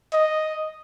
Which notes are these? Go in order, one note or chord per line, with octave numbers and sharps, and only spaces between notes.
D#5